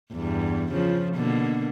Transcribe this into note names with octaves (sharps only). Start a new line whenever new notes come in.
E2 G2
C#3 F3
B2 D3 A#3